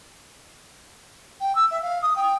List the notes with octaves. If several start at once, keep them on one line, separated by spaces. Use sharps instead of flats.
G5
E6
E5
F5
D#6
G5